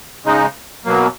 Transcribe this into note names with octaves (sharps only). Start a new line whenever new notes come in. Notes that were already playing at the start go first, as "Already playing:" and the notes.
C#3 G#3 D#4
B2 F#3 A#3